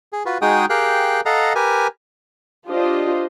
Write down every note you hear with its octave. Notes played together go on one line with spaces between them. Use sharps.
G#4
F4 F#4 B4
G#3 D#4 F#4 G#4 G5 D#6
G4 G#4 A#4 F5 G5 F#6
A4 D#5 F5 F#5 A#5
G4 A#4 B4 G#5
D4 F4 G4 C5 D#5